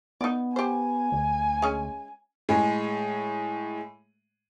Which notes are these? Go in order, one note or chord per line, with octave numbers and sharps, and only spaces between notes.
B3 D#4 D5
G4 C5 G#5
D2
G#3 C#4
A2 G#3 G#4